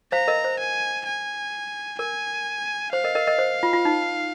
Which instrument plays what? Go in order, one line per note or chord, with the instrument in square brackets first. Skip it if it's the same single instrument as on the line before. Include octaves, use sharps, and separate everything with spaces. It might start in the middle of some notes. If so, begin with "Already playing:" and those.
[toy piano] C5 F5 [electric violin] A#5
[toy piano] A#4 D#5
C5
[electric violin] G#5
G#5
[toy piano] A#4 [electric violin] G#5
[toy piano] C5 [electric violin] F5
[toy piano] A#4 D#5
A#4 D#5
A#4 D#5
C5
F4
F4
D#4